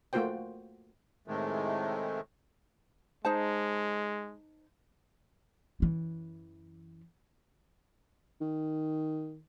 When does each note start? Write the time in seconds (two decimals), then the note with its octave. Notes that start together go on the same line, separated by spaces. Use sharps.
0.13 A3 A#3 F4 F#4 C5 G5
1.28 A2 C3 D#3 G#3 A3
3.25 G#3 D#4 C5 A5
5.80 F#2 E3
8.41 D#3